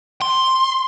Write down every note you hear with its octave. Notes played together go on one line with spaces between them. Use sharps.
C6